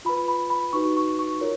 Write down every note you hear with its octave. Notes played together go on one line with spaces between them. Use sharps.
F4 B4 B5
B5
B5
D#4 F#4 B4 C#6
C#6
C#6
F4 A#4 C#5